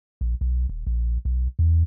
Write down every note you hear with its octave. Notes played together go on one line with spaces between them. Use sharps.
A#1
B1
D#1
A#1
B1
E2